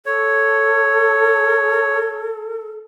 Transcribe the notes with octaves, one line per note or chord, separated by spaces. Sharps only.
A4 C#5